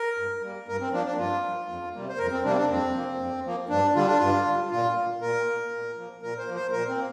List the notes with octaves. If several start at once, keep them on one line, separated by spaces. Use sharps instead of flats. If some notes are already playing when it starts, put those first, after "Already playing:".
Already playing: A#4
G2
G3 A#3
G2 A#4
C4
F3 A#3 D4
D4
G2 F4
F3 A#3
F2
C3 G3 A#3
C5
F2 A#4
C4
C3 G3 A#3 D4
C4
D4
F2 C4
F3 A#3
F2
F3 A#3
G2 D4
D3 G3 F4
D4
G2 F4
D3 G3
A#2 F4
A#3
A#2 A#4
A#3
A#2
F3 A#3
A#2 A#4
C5
F3 A#3
C5
A#2 A#4
C4
A#3